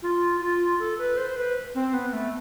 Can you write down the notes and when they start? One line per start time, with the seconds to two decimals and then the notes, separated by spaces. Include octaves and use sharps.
0.03 F4
0.41 F4
0.80 A4
0.99 B4
1.17 C5
1.36 B4
1.75 C4
1.94 B3
2.13 A3